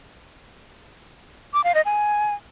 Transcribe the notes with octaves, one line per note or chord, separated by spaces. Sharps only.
D6
F5
D#5
G#5